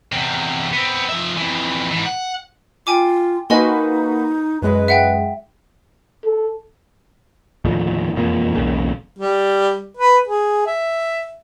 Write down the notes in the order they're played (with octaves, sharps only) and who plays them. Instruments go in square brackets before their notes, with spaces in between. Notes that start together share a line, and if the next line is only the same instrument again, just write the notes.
[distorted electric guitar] E2 C3
B3 C4
F3 E5
F2 E3
G#2 E3
F#5
[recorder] F4 [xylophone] G5 G#5 D6
[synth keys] A#3 F#4 B4 [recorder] D#4 [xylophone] D#5 G#5 C6
[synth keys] F#2 G#3 [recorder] B4
[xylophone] E5 F#5 G5
[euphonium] A4
[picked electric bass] D#2 A2 D3 F3
E1 F2 F3 A#3
E1 B1 C#3 A#3
[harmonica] G3
B4
G#4
E5